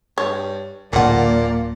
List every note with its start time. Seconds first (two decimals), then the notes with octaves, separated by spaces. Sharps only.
0.18 G2 C#5
0.93 D1 A#2 D3 F3 A#3 D5 F#5